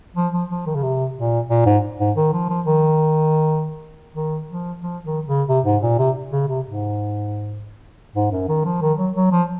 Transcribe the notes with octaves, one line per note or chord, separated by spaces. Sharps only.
F3
F3
F3
D#3
C#3
C3
A#2
A#2
G#2
G#2
D#3
F3
F3
D#3
D#3
F3
F3
D#3
C#3
C3
G#2
A#2
C3
C#3
C3
G#2
G#2
F#2
D#3
F3
D#3
F#3
F#3
F3